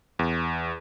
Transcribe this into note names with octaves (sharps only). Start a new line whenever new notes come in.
E2